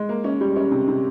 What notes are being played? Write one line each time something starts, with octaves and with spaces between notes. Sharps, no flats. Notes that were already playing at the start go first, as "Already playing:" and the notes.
Already playing: G#3
A#3
C#4
G3
C#4
C3
C3